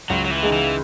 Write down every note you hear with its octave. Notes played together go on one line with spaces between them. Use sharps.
C#2 F#3
F#3
E3
C#3 G#3 D#4 G#4
E3